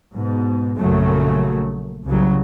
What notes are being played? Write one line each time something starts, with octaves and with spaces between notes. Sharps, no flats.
G#2 B2
A#1 F#2 C#3 F#3 A3
C2 C#3 F#3